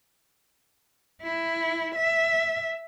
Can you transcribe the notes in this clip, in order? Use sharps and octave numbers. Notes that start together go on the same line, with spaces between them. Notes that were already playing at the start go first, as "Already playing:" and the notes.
E4
E5